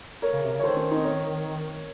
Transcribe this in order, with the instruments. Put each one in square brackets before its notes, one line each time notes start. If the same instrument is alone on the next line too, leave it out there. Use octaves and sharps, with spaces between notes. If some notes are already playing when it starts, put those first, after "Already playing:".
[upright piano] A#4 C#5
[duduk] C#3
C3
C#3
[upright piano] C#5
[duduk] D#3 [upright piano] A4 C5
[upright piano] C#4
C4 D#4
A#4 C#5